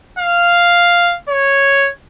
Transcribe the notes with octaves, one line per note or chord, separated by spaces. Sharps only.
F5
C#5